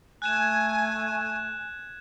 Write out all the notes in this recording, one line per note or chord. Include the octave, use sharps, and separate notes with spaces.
A3 G#5 F#6 G#6 E7